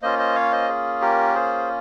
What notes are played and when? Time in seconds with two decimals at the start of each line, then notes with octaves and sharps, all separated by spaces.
0.02 A#3 C#4 F4 C5 D#5
0.19 C5 D#5
0.35 C#5 F5
0.52 C5 D#5
0.68 G#4
1.01 G4 A#4
1.34 G#4 C5